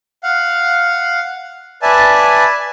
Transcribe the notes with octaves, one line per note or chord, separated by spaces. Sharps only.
F5 F#5
B4 D5 E5 G#5 A5